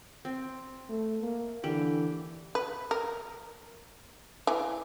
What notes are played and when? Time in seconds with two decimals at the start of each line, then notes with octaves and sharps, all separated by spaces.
0.25 C4
0.89 A3
1.21 A#3
1.64 D3 E3 G4
2.55 B4
2.91 A#4
4.47 E3